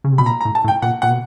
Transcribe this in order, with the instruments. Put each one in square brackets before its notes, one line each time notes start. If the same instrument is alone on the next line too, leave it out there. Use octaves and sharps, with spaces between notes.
[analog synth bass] C#3
C3
[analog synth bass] B2 [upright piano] B5
[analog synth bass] A#2 [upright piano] A#5
[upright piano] A#5
[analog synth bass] A2
[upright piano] A5
[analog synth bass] A2
[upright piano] G5
[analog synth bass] A#2 [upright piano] F#5
[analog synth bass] A#2 [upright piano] F#5
[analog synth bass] B2